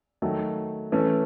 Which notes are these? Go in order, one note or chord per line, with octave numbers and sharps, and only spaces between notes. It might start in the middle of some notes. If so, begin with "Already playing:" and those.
D#3 F#3 A3
E3 A3 C#4